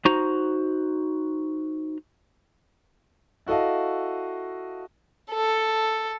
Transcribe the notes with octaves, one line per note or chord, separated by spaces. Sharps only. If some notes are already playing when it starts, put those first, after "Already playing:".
D#4 F#4 C5 A#5
E4 F#4 A4 D#5 F5
A4